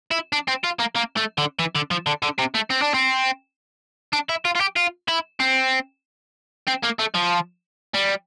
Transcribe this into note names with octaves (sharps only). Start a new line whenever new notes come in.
E4
D4
C4
F4
A#3
A#3
A3
D3
E3
D3
F3
D3
D3
C3
A3
C4
D4
C4
D4
E4
F4
F4
G4
F4
E4
C4
C4
A#3
A3
F3
G3